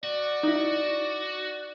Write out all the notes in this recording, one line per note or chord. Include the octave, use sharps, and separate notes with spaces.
F#4 D5
D#4 E4